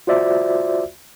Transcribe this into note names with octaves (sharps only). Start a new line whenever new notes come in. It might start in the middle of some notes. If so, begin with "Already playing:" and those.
F4 F#4 C5 D5 E5